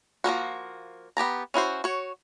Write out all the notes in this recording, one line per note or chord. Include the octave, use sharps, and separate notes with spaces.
F3 G3 A#3 F#4
B3 G4 A5 A#5
C#4 E4 F#4 C5
F#4 C#5